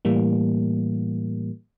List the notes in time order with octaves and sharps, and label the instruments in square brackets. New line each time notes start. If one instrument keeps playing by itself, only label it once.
[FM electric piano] A2 E3 G3 A#3